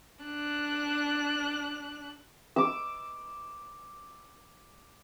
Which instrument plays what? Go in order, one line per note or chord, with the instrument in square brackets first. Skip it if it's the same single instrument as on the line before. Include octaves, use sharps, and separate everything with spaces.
[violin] D4 F#6
[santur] D6 E6